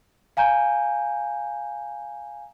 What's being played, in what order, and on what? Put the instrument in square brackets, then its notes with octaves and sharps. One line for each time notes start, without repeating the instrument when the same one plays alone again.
[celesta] F5 G#5 A#5 G6